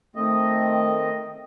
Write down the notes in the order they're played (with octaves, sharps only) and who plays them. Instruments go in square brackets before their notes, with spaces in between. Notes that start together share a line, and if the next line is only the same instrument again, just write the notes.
[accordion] D#3 C4 D#5 [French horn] A3